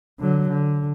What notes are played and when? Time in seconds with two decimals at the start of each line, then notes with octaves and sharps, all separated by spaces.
0.19 D3 F#3
0.49 D3